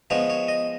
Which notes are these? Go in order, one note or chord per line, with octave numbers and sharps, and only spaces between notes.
F3 G#3 B3 D#4 C#5
C#5
D#5